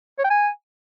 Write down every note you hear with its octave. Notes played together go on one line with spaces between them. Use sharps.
C#5
G5
G#5